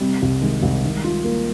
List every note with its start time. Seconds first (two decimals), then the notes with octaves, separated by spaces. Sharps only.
0.01 C3 G3
0.22 C2
0.42 D#3 G#3
0.62 C2
0.84 D#3
1.04 F4
1.24 A#3